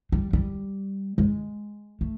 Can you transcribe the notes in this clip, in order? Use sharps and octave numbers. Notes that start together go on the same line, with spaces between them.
G3
G3
G#3
A3